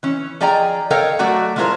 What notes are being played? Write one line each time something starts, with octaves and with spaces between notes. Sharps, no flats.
E3 C#4
F3 G#4 D5 D#5 G5 A#5
A4 A#4 C#5 D#5 F5 G5
F#3 A3 F#4 D5
F3 G#3 E4 F4 A#4 C5